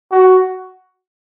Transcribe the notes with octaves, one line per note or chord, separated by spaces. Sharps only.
F#4